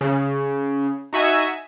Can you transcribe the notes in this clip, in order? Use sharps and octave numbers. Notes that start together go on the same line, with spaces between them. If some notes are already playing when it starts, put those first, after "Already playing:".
C#3
D#4 F#4 E5 G#5